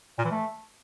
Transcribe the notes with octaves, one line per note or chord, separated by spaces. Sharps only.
A#2
E3
A3